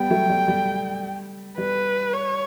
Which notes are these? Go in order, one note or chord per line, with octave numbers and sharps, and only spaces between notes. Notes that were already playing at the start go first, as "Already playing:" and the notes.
Already playing: G3 B3 G5
F#3 A3
G3
G3
G3 B4
C#5